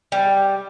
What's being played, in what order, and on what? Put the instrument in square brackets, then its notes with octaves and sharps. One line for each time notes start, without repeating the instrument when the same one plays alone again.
[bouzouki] G3